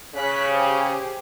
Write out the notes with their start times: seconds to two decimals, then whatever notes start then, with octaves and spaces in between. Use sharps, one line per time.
0.15 C#3 C#5 F#6 B6
0.51 G4 G#4 C5